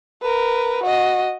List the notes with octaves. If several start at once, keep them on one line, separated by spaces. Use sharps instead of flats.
A#4 B4
F#4 D#5